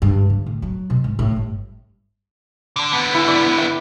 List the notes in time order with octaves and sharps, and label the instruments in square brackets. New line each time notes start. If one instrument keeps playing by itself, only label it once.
[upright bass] G2
D3
A2
F#3
B2
G#2
A2
G1
[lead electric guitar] D3 D4
D3 B3
[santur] E4 G#5
D5
E5 G5